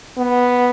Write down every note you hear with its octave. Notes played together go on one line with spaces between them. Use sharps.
B3